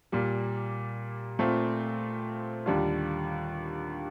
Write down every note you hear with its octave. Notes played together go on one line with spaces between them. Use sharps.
A#2 G3 A#3
A#2 A3 C4 F4
D#2 D3 G3 D4 F4